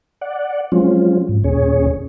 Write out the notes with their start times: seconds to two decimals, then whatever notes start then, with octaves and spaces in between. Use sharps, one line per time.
0.21 D5 F#5
0.72 F3 F#3 G#3 C4 C#4 F4
1.29 G#2
1.44 D#2 A#2 C#4 G#4 C#5